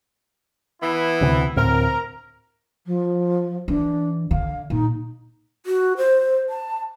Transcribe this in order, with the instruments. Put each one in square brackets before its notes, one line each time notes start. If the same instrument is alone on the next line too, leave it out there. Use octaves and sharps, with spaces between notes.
[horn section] E3 B3 E4
[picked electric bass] D2 C3
[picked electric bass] D2 A2 C4 [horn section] A#4 A#5
[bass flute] F3
[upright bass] E3 [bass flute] D4
[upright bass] D3 [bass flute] F5
[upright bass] A#2 [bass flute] D#4
[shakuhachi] F#4
C5
A5